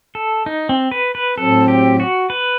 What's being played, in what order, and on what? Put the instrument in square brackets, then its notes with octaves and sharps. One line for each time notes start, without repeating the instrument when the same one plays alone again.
[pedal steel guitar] A4
D#4
C4
B4
B4
[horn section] A2 F#3 C4 [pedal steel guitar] A4
[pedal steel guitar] G4
F#4
B4